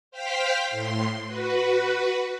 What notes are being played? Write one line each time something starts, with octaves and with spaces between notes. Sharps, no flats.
C5 F5 G5 F6 B6
A2 C6
F#4 B4